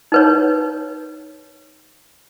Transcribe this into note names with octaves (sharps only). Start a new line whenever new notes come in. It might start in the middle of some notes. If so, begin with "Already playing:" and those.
D#4 B4 C#5